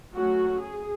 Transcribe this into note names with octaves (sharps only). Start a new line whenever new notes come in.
F#3 A3 C#4 F#4
G#4